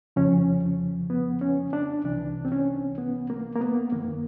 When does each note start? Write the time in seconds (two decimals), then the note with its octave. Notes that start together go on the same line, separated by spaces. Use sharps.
0.16 F2 C#3 F3 C#4
1.10 B3
1.41 C#4
1.73 D4
2.04 C2 C3 E3 D4
2.45 C4
2.52 C#4
2.98 B3
3.30 A#3
3.56 A#3
3.61 B3
3.92 F#2 D#3 A#3